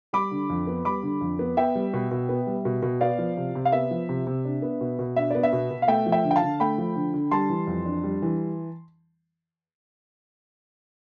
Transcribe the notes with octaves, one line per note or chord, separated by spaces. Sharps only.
G3 B5 D6
D3
F2
B3
G3 B5 D6
D3
F2
B3
B3 E5 G5
G3
B2
B2
B3
G3
B2
B2
B3 D5 F5
F3
C3
C3
F5
B3 E5
F3
C3
C3
D4
B3
B2
B2
D4 E5
B3 D5
E5
B2
B2
F5
A3 E5 G5
F3
E5 G5
D3
G5
F5 A5
D3
A3 G5 B5
F3
D3
D3
G3 A5 C6
E3
F2
D4
G3
E3